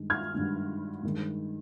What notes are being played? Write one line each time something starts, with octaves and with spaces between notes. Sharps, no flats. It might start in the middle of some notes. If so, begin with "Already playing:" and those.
Already playing: G2 D#3 G#3
F6 G#6
G2 D#3 G#3 D4
G2 D#3 G#3 D#4